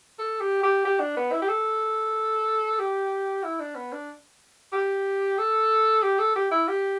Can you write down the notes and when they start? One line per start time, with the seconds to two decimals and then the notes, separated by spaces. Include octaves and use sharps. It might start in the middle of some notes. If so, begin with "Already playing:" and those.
0.19 A4
0.40 G4
0.63 G4
0.85 G4
1.00 D4
1.17 B3
1.32 E4
1.42 G4
1.48 A4
2.79 G4
3.44 E4
3.60 D4
3.76 B3
3.93 D4
4.73 G4
5.39 A4
6.02 G4
6.19 A4
6.36 G4
6.51 E4
6.68 G4